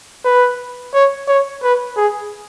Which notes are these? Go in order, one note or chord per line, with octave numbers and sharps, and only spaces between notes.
B4
C#5
C#5
B4
G#4